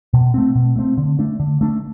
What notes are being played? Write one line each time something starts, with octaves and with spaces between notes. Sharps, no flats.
B2
A3 C4
B2
A3 C4
D3
A3 D4
D3
A3 D4